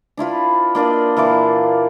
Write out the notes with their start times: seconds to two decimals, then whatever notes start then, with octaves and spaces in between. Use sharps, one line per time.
0.17 D4 E4 F4 B4
0.75 A#3 D4 D5 D#5
1.17 A#2 E3 F4 D6